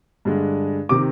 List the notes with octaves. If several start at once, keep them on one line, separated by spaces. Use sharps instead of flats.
G2 D3 G#3
C3 D#3 D6